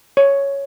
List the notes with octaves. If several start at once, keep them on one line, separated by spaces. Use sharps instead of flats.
C#5